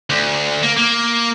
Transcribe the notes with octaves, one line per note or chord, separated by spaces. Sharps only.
D2
A#3
A#3